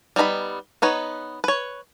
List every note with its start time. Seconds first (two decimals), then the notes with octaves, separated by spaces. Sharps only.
0.16 G3 B3 D#4 A#5 B5
0.82 B3 D#4 B4 C#5
1.44 B4 C#5